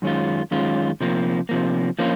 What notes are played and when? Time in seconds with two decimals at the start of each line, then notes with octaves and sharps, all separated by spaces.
0.02 F#2 D#3 G#3 C#4 F4
0.51 F#2 D#3 G#3 C#4 F4
1.01 C3 F3 A#3
1.49 C3 F3 A#3
1.99 F3 A#3 C#4 F4